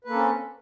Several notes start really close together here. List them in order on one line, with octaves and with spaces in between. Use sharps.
B4 A#3 A4 C#4 C4